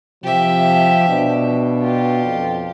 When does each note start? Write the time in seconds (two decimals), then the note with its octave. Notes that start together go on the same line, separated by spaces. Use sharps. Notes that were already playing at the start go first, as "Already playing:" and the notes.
0.24 C3 F3 G4 E5
1.09 B2 D4
1.80 F4 G4
2.25 F2